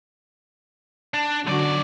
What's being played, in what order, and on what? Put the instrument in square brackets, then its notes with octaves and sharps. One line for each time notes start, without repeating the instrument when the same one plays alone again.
[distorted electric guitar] D4
[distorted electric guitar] B1 D5 [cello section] D3 F#3 F#4